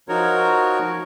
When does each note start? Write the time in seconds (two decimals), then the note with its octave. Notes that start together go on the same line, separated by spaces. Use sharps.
0.09 F3 D#4 F#4 A#4 C#5